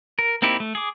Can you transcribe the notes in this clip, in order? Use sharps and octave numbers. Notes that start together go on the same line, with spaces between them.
A#4
A#3 C4 D#4 E4 G4
A3
G#4 D6